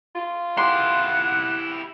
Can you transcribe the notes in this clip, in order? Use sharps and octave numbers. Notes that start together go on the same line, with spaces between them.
F4
E4 G4 F#5 C6